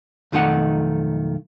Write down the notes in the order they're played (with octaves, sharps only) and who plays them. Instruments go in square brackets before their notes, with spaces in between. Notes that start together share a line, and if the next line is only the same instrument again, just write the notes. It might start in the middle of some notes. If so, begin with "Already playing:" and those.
[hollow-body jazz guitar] B1 F2 D#3 A3 D#4 F#5